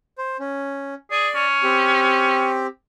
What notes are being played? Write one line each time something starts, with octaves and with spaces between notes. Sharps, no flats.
C5
C#4
G#4 D5
C#4
C4 G4